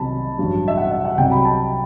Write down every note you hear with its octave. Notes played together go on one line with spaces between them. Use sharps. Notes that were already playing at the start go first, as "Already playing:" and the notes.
Already playing: C2 C3 D#3 F#3 A5 B5
A1 G2 F#3
E5
F#5
E5
F#5
C2 C3 F#3 G5
B5
A5